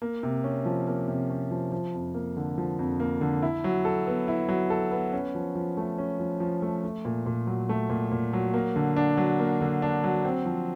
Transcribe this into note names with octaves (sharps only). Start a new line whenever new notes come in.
A#3
C3
C#4
F3
A#3
C3
C#4
F3
F3
F2
A#3
D3
F3
F2
A#3
D3
E4
F#3
A4
B3
E4
F#3
A4
B3
C#4
F3
F3
A3
C#4
F3
F3
A3
A3
A#2
A#2
F#3
A3
A#2
A#2
F#3
A#3
D3
D4
F#3
A#3
D3
D4
F#3
C4
F3